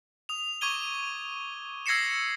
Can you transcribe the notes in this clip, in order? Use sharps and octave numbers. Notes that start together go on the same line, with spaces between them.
D#6 F7
C#6 D6 G#6 D#7 G7
E6 G#6 A#6 C7 C#7 E7